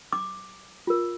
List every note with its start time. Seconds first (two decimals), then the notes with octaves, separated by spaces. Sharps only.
0.13 D6
0.87 F4 A#4